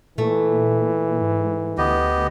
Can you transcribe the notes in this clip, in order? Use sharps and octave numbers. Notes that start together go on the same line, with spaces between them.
A#2 E3 A3
G#2
D2 B3 G4 D#5